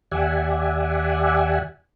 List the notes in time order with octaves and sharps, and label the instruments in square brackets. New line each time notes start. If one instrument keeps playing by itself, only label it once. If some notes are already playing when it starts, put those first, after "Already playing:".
[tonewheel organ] D#2 G4 D5 E5 F#5 G#5